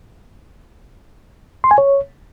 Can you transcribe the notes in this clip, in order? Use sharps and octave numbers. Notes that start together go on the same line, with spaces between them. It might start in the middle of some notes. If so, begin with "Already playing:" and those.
C6
G#5
C#5